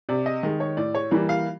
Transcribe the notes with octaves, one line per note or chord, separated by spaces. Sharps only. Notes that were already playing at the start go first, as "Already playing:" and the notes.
C3 D5
D#5
D#3 G#3
C#5
A2 D5
C#5
E3 G3 A#3 D5
F5